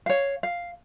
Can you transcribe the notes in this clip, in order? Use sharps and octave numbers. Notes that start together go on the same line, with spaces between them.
C#5 F5
F5